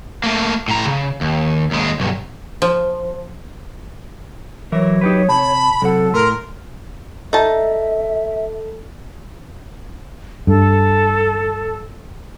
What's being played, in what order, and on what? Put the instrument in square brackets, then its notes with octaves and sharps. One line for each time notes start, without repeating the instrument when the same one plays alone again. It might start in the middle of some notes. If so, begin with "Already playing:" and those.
[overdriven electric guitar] A3 A#3
A2 A#5
C#3
D#2
D#2 G#3
B1 G2
[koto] F3
[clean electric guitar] E3 A#4 E5 [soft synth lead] F#3 [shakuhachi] C#5
[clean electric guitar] D#4 G4 B4
[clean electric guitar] C3 [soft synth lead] A5 [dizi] B5
[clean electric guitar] C3 F#5 [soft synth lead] F#3 [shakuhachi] A4
[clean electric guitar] A2 [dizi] A#4 [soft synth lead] C6
[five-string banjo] D#4 A5 [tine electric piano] A4 [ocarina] E5
[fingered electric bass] G2 [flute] A4